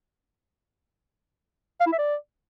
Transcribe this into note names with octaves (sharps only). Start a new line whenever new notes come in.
F5
E4
E5
D5